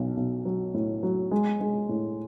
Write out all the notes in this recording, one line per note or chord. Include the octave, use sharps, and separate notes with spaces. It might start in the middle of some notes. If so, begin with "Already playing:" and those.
Already playing: B1 F#3
B1
F#3
A2
F#3
G#3
G#3
A2